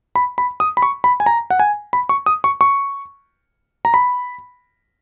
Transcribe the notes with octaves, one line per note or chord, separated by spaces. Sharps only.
B5
B5
D#6
B5
C#6
B5
G#5
A#5
F#5
G#5
B5
C#6
D#6
C#6
C#6
A#5
B5